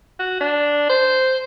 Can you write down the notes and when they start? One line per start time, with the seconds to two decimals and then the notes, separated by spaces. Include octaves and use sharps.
0.19 F#4
0.40 D4
0.89 C5